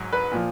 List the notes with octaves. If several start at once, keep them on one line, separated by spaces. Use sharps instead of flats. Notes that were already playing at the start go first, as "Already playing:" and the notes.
Already playing: G#2 F#3
B4
A#2 F3